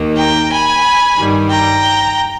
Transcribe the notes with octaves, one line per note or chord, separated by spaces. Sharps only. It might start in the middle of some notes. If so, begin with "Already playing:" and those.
Already playing: D#2 D#3 A#3
G5 A#5
G#5 B5
G2 D#3 G3
G5 A#5